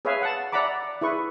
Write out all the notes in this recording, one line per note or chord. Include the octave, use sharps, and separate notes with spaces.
G#4 B4 C#5 E5 F5 G#5
F#5 A5
D5 E5 F#5 A#5 B5 D6
E4 G#4 B4 C#6